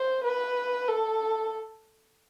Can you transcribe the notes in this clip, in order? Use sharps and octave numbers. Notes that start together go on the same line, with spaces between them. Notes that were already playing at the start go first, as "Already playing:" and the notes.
Already playing: C5
B4
A4